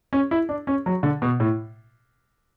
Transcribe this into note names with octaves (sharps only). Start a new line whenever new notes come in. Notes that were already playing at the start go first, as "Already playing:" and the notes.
C#4
E4
D4
C#4
F#3
D3
B2
A2